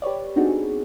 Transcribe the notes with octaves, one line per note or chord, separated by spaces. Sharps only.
G4 B4 C#5 D5
B3 C4 D4 D#4 F#4 G#4